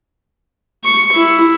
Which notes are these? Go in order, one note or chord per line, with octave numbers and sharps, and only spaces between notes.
C#6
E4